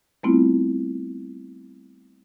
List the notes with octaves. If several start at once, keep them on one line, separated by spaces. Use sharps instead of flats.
G3 A3 B3 C4 E4 F4